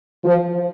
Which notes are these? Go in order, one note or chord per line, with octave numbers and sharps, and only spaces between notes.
F3